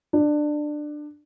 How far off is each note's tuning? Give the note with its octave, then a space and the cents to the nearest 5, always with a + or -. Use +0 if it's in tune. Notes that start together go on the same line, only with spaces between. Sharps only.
D4 +20